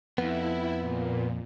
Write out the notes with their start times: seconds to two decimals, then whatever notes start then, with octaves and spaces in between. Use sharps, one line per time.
0.18 F2 B3 E4
0.80 A#2